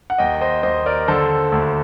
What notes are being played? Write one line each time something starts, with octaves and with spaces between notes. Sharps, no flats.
F#5
D#2 D#5 G5
C5 D#5
D#2 C5 D#5
A#4 D5
D3 A4 C5
D2